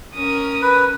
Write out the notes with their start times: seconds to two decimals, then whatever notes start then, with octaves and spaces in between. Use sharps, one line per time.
0.15 C#4 A#4 D#6
0.62 B4